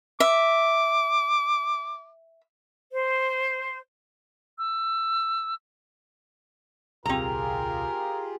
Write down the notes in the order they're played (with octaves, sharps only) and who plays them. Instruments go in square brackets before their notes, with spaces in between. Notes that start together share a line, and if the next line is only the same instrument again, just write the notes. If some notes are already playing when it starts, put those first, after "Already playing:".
[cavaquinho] E5 [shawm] D6
[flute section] C5
[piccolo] E6
[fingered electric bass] D#1 C2 [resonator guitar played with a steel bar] C4 A#5 [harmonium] F4 G4 G#4 [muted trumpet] A#4